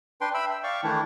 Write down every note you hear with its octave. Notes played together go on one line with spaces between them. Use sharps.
D4 B4 G5 C6
E5 G5 B5 E6
E6
D5 F5 G5 C#6 D6
D#3 E3 A3 D4 E4